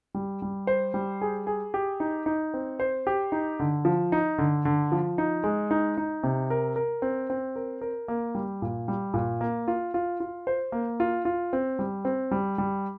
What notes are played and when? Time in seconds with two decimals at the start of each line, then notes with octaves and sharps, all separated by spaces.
0.15 G3
0.42 G3
0.67 C5
0.94 G3
1.21 G#4
1.47 G#4
1.74 G4
2.00 D#4
2.26 D#4
2.54 C4
2.80 C5
3.07 G4
3.32 D#4
3.60 D3
3.85 F3
4.12 D#4
4.38 D3
4.65 D3
4.92 F3
5.18 D#4
5.44 G#3
5.71 D#4
5.97 D#4
6.23 C3
6.50 A#4
6.76 A#4
7.02 C4
7.30 C4
7.56 A#4
7.81 A#4
8.08 A#3
8.35 G3
8.62 A#2
8.88 G3
9.14 A#2
9.41 A#3
9.68 F4
9.94 F4
10.20 F4
10.47 C5
10.72 A#3
11.00 F4
11.25 F4
11.53 C4
11.79 G3
12.05 C4
12.31 G3
12.58 G3